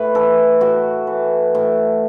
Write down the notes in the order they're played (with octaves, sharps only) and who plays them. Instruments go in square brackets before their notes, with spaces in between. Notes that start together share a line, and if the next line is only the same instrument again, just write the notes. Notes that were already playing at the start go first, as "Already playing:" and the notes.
Already playing: [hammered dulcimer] A2 B4 C#5
E3 A4
A2 F#4
E3
A2